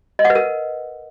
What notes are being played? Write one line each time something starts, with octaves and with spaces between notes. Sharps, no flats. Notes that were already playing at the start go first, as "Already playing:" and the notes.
D#5
F#5
B4
A#4